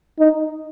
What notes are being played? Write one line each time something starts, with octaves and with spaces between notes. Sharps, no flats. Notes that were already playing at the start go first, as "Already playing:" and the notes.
D#4